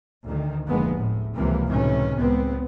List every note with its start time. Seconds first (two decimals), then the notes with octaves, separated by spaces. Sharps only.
0.25 D2 D#3
0.67 F1 D2 G#3 A#3 B3
0.96 A2
1.35 C#2 C3 E3 F3 A#3
1.68 C#2 A2 C3 D#3 E3 C#4
2.18 C#2 B3 C4